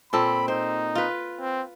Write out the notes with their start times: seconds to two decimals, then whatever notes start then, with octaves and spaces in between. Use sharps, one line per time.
0.13 A#2 C4 A4 B5
0.48 D#4 C5
0.95 F4 B4
1.40 C4